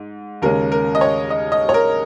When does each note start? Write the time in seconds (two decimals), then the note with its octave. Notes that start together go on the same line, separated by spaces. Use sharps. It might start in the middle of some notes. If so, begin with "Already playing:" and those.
Already playing: G#2
0.42 D#2 C#3 G#3 C#4 A#4
0.72 A#4
0.95 D#5
1.01 C#5
1.30 D#5
1.52 D#5
1.69 C#5
1.74 A#4